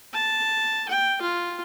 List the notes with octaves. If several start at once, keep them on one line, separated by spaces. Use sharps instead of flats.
A5
G5
F4